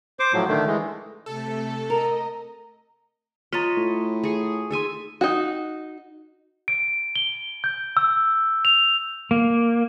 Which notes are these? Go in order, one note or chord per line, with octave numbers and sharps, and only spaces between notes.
C5 D6
A2 F3 F#3
D3 D#3 A3
E3 G#3
C3 A3 A4
A#4 D#5 A#5
F4 C#5 D#5 A#5 C6 A6 B6
A2
G#4 C#6
D#4 G#4 A4 E5 G#5 C6
D#4 F#4
D7
G7
G6
E6
F7
A#3